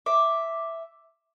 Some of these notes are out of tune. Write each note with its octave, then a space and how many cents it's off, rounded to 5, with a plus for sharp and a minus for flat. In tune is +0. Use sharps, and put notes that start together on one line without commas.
E5 +0 D6 +0